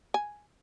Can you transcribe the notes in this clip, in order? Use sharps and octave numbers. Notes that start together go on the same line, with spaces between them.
G#5